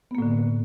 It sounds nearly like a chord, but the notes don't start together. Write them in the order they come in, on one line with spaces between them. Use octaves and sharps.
B3 A#3 A2 D3